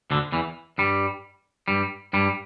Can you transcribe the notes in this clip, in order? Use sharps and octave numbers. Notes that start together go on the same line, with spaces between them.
D2 D3
E2 E3
G2 G3
G2 G3
G2 G3